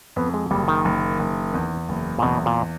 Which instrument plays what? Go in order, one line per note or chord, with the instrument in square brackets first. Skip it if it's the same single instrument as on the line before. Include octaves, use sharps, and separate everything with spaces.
[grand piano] F2 [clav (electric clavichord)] B3
[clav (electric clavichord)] G#3
[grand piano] F#1 [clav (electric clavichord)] G3
[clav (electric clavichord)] D#3
[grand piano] F#1
F#1
E2
F#1
[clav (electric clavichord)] A#2
[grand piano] E2 [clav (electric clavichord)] B2
[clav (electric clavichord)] A#2